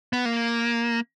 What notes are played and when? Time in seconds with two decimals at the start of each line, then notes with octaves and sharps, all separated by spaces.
0.13 B3
0.25 A#3